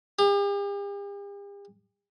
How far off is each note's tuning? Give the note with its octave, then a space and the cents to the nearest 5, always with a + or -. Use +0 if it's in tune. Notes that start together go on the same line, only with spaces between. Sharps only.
G4 +45